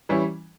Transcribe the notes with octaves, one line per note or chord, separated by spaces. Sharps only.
E3 G3 C#4 E4